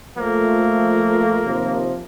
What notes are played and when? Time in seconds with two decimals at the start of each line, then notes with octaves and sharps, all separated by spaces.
0.18 F3 A3 A#3
1.43 D#2 C3 F3